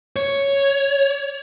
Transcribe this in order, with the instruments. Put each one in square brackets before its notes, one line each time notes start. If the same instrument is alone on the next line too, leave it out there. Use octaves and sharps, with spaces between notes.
[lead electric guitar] C#5